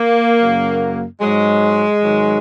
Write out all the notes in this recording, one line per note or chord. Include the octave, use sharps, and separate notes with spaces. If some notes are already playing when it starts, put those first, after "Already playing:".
Already playing: A#3
F#2 C#3 F#3
G#2 F#3 G#3
G#2 D#3 F#3